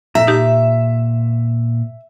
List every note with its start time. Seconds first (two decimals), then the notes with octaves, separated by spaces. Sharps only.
0.15 A#2 E5 A#5
0.27 D#4 G4